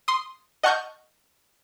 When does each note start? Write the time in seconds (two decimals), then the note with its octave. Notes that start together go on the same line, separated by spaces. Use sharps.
0.08 C6 D#6
0.63 D#5 F#5 A5 C#6 F6 G6